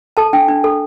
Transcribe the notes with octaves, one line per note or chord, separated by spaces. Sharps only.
A4 A5
D4 G5
D4
A4